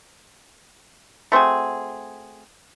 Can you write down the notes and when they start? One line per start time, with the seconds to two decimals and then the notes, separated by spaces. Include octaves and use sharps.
1.32 A3 C4 F#4 G#4